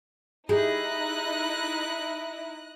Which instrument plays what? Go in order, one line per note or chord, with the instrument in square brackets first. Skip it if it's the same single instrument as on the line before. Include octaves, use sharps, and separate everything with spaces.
[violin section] D#4 E4 [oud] G4 G#4 [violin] D#5 F#6